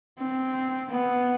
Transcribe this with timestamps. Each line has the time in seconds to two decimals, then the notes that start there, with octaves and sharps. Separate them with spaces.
0.19 C4
0.90 B3